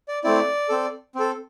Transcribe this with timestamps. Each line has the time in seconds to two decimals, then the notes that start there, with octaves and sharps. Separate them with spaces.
0.08 D5
0.24 A3 C4 E4 D5
0.69 C4 A4
1.15 C4 A4